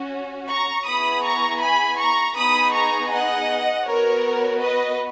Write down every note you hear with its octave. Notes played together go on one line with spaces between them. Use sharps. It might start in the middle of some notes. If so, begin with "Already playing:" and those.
Already playing: C#4 F#4
A#5 C#6
B3 E4 G#4 B5 D#6
A#5 C#6
G#5 B5
A#5 C#6
B3 D#4 G#4 B5 D#6
A#5 C#6
D#5 F#5
B3 F#4 A#4 C#5
B4 D#5